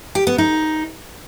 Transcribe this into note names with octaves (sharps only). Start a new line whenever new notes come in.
G4
B3
D#4